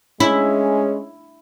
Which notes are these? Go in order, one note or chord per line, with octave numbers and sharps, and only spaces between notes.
G#3 C#4 E4